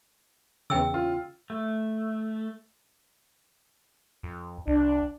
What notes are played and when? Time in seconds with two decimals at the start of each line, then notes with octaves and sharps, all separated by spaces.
0.70 E2 C#3 G5 E6
0.94 F4
1.50 A3
4.23 F2
4.67 C2 D4